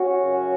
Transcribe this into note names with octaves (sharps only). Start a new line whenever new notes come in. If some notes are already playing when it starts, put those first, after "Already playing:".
Already playing: C#4 F#4
F#2 C#3